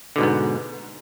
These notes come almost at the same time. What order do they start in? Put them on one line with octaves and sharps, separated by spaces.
D3 B2 G#2 B3